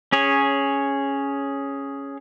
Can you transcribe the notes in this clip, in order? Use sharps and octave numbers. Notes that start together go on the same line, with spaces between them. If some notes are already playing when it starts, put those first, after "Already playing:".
C#4 G#4 C#5